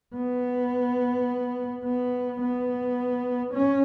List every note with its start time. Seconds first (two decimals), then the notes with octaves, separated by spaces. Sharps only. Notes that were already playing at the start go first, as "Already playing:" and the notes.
0.14 B3
1.84 B3
2.40 B3
3.53 C#4